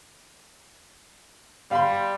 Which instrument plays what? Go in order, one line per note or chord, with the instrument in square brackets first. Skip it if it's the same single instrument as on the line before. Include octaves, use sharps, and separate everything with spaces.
[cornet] G3 [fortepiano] F5 B5 C6